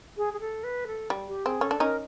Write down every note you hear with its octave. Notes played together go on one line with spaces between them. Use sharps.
G#4
G#4
A4
B4
A4
G3
G4
C4 G#4
C#4 A4
D4
C#4 D#4 A#4